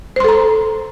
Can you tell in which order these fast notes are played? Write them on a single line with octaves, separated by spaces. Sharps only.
C5 C6 A4 A#5